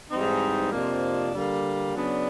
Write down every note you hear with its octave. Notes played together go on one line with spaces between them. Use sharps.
G#2 E3 G3 C4 D#4
F2 C3 F3 A#3 D4
D3 G3 A#3
C#3 F#3 B3 D4